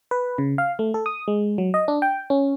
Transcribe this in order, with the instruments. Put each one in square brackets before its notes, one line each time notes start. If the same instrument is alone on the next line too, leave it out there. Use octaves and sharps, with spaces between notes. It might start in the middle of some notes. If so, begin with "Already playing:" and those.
[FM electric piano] B4
C#3
F5
A3
A4
D#6
G#3
F#3
D#5
D4
G5
C#4